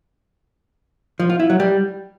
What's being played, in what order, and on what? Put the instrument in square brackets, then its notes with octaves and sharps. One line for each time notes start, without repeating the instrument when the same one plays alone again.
[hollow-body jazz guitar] F3
F4
E4
F#3
G3